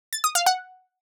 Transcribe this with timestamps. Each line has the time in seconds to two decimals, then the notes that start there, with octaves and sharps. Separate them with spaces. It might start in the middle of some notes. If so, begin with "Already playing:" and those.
0.13 A6
0.24 D#6
0.35 F5
0.46 F#5